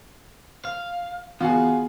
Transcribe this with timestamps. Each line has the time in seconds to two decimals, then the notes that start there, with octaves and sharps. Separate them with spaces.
0.65 F5
1.40 E3 B3 F4 F#4 G#4